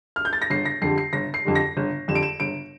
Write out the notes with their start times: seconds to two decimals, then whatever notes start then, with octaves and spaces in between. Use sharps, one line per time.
0.16 F6
0.25 G6
0.33 A6
0.42 A#6
0.50 G1 C7
0.65 A#6
0.82 F2 D3 G3 C7
0.98 C7
1.13 G1 A#6
1.34 C7
1.45 F2 D3 G3
1.55 A#6
1.77 G1
2.08 F2 D3 G3 E7
2.15 D7
2.23 E7
2.40 G1 D7